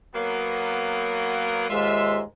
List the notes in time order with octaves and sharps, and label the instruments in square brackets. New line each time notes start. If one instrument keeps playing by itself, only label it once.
[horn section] F#3 A#3 B3
[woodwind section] D#2 G#2 G#3 [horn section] F4 E5